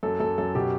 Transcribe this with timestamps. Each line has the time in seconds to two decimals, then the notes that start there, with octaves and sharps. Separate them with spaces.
0.03 F#2 A4
0.20 F#2 A4
0.38 F#2 A4
0.55 B2 G4